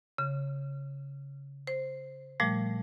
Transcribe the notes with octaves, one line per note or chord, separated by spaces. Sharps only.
C#3
C5
A#2 F3 G3 A3